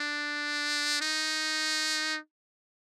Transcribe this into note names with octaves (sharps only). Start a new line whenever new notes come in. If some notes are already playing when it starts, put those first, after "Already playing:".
Already playing: D4
D#4